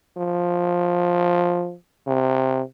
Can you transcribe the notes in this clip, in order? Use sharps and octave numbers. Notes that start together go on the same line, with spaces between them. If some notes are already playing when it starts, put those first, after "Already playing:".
F3
C3